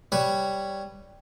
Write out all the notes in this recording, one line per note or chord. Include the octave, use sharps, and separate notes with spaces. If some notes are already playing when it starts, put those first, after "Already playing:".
G3 B4 C#5